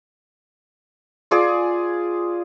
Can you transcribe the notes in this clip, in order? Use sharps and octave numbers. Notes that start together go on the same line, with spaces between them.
F4 G#4 D5